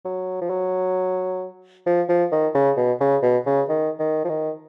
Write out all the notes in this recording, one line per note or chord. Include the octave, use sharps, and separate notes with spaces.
F#3
F3
F#3
F3
F3
D#3
C#3
B2
C#3
B2
C#3
D#3
D#3
F3
D#3